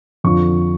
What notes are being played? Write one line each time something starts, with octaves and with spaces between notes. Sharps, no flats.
F2 D3 F3 C#6